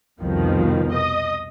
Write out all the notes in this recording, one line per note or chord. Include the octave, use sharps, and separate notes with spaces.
C2 F2 B2 D#3 F3
D#5 D#6